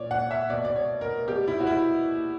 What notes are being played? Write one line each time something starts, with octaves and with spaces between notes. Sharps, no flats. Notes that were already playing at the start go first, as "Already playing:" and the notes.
Already playing: A#2 C#5 D5
F#5
E5
B2 D5
D5
C#5
A#4
B2 G4
E4
F#4
E4